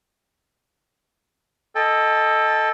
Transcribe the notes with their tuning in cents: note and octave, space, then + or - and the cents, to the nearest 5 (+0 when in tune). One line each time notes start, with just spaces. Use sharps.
A4 +0 D#5 +0 G5 +35